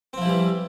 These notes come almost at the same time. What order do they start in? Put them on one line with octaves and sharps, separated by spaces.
C4 F3 E4 G3 E3